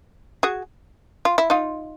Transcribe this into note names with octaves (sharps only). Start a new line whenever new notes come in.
F#4 G#4
F4
E4
D#4 F4